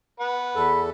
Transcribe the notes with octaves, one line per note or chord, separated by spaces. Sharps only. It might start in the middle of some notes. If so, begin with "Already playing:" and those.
B4 F#5
E2 A4 B5